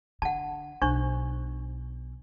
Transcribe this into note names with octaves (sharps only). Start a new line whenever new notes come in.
D3 F#5 A5
B1 D4 C5 C#6